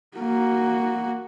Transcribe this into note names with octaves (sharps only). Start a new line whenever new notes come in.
A#3 F#4